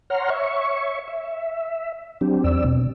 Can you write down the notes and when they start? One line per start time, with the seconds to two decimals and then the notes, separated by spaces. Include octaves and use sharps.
0.10 C#5 F#5 A#5 C6 F6
0.30 C#5 E5 C#6
1.08 E5
2.21 F#3 C4 D4 G4
2.44 E2 C4 D5 E6
2.64 B2